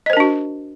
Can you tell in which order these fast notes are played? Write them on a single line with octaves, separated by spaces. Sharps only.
D#5 C5 A#4 D4 F#4